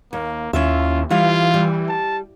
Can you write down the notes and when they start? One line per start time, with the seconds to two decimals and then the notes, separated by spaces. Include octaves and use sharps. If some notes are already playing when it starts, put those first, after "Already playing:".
0.13 D#2 A#3
0.53 D#2 C#4 E4 F4 E5
1.10 E3 G3 E4 F4 F5
1.54 G3
1.89 A5